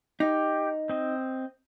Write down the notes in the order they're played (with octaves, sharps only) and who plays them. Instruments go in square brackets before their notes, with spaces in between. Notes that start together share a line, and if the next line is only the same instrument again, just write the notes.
[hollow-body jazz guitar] D#4 [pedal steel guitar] G4
[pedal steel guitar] C4 D#5